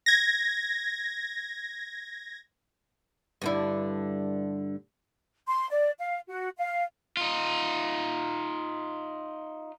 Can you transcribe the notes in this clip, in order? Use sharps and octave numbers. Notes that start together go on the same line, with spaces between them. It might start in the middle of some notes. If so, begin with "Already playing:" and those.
G#6 A#6
G2 D3 E4
C6
D5
F5
F#4
F5
D#4 F4